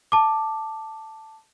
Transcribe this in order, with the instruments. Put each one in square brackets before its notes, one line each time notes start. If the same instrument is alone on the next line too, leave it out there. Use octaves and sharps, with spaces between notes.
[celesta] A5 D6